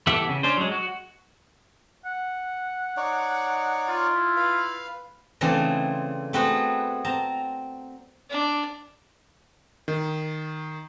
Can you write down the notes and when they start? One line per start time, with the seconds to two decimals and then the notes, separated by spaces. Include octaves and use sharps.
0.07 E3 B3 G4 A4 E5
0.29 C#3
0.43 C#4 D4 C5
0.57 F#3 G#3
0.72 F#4
2.06 F#5
2.97 D#4 C#5 D5
3.88 F4
4.15 E4
4.37 B4 F5
5.41 C#3 E3 A3 C4 D4
6.33 A3 B3 C4 F#4 G#4 B4
7.05 C4 A5 A#5
8.30 D4
9.88 D#3